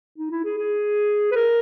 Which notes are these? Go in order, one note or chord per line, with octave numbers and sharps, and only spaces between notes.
D#4
E4
G#4
G#4
B4
A#4